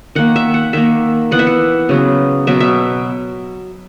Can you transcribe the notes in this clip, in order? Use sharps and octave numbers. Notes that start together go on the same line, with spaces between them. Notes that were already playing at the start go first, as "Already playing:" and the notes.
D#3 A#3 F#5
E5
F#5
D#3 A#3 E5
E3 B3 F#5
E5
F#5
C#3 F#3 B3
B2 F#3 B3 E5
E5